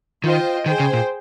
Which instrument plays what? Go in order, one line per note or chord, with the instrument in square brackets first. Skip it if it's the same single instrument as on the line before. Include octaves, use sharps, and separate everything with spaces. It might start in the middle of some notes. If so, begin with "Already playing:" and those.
[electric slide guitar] D#3 [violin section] F4 C5 D#5 G5
[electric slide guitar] D#3 [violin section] G#4 C5 G5
[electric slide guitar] C#3
A#2